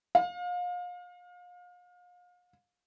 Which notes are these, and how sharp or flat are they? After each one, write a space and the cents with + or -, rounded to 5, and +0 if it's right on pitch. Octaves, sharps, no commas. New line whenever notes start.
F5 +35